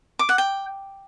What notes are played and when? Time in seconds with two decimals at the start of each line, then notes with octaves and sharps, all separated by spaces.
0.19 D6
0.29 F#5
0.38 G5